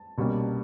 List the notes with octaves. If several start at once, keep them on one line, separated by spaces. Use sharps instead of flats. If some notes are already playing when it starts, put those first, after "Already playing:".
Already playing: A5
C2 B2 G3 A#3 C#4